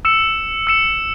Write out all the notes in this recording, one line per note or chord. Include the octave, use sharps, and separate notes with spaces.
E6 C#7 E7
E6 C#7 E7